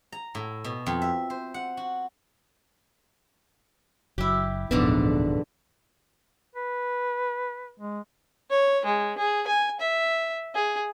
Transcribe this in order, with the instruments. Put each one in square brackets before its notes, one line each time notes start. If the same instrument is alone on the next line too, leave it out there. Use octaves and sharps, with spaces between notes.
[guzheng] A#5
A2
B2
F2
E5
C5
F#5
F#4
[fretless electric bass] F#1 [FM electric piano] F#3 [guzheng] E4 G4
[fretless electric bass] D1 [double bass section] A1 F2 B2 [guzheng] G#2 D3 D4 [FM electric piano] B3
[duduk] B4
G#3
[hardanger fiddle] C#5
G#3
G#4
G#5
E5
G#4